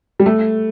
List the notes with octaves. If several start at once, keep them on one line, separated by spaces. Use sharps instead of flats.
G3
A3